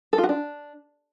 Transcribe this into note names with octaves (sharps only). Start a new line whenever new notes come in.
A4
F4
F#4
D4